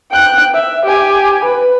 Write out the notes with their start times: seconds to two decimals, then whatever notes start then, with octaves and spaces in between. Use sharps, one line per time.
0.11 G5 F#6
0.54 E5
0.85 G4 G#5
1.45 B4